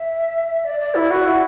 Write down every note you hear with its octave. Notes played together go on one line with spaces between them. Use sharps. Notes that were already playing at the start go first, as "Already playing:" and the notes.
Already playing: E5
D5
D5
E4
F#4
E4